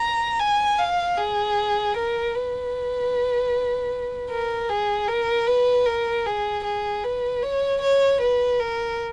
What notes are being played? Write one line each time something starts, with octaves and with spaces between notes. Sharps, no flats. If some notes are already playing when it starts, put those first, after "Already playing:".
Already playing: A#5
G#5
F5
G#4
A#4
B4
A#4
G#4
A#4
B4
A#4
G#4
G#4
B4
C#5
C#5
B4
A#4